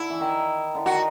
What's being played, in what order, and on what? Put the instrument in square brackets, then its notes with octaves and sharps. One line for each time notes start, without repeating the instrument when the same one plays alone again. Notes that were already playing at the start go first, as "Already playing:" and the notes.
Already playing: [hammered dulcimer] D3 [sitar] E4
[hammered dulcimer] E3
D#3
D3
[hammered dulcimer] D#3 [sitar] F#4